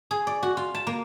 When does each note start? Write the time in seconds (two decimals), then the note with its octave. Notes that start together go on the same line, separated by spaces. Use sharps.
0.11 G#4
0.27 D5
0.43 F#4
0.57 F4
0.74 A5
0.87 A#3